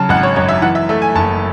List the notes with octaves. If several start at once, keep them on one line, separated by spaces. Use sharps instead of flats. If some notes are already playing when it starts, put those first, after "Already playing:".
Already playing: C#3 F#3 A5
G#1 F#5
C#5
F#2 C#5
E5
E3 F#5
E5
A3 E5
G#5
F#1 A5